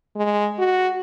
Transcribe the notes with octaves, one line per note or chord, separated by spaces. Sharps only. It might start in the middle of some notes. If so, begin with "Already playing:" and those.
G#3
F#4